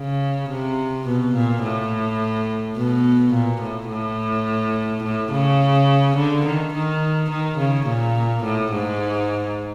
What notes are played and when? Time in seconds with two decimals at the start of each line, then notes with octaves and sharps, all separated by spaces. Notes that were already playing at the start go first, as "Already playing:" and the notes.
Already playing: C#3
0.50 C3
1.06 B2
1.35 A#2
1.63 A2
2.77 B2
3.33 A#2
3.61 A2
3.90 A2
5.03 A2
5.32 C#3
6.16 D3
6.45 D#3
6.73 D#3
7.30 D#3
7.58 C#3
7.86 A#2
8.43 A2
8.71 G#2